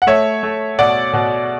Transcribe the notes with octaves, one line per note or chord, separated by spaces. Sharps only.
F#5
A3 C#5 E5
A3
B2 D5 F#5
B2